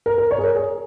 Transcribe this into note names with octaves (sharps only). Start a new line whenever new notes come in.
A#4
A#4
C#5
G#4
A#4
G#4